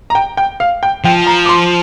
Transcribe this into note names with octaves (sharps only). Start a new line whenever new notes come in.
A#5
G5
G5
F5
G5
F3 G5
A#5
D6
C6